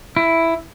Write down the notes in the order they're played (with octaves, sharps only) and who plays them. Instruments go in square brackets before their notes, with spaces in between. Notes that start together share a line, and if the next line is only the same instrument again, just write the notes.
[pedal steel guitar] E4